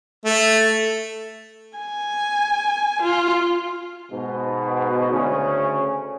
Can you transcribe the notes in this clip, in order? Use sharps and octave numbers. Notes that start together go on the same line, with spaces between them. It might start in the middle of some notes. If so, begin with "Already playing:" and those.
A3
G#5
F4
G#2 B2
D2 C#3 C#4